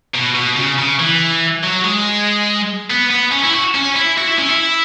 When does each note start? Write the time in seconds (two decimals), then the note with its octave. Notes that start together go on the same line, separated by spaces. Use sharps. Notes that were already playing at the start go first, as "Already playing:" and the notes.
0.15 B2
0.35 B2
0.56 C#3
0.78 C#3
0.99 E3
1.63 F#3
1.84 G#3
2.91 B3
3.11 B3
3.32 C#4
3.44 E4
3.53 F#4
3.75 C#4
3.96 E4
4.18 F#4
4.27 E4
4.38 C#4
4.49 E4